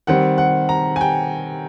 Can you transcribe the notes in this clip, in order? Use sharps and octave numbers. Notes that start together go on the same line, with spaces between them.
D#3 G3 C4 F#5
F#5
A#5
G#5
G5